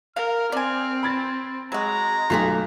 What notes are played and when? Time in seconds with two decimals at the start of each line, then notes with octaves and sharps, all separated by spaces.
0.16 A#4 F5 F6
0.52 C4 D5 G#5
1.03 B5 G#6 A6
1.72 F#3 G#3 F#4 A#5
2.30 B1 A3 F4 G4 G#4 B6